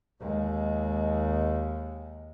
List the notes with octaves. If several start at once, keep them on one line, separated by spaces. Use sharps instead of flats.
D#2 G#3